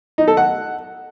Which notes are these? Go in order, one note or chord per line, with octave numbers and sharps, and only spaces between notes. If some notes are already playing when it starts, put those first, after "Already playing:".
D#4
A4
F#5